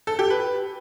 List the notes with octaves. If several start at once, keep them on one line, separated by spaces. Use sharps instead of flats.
A4
G4
B4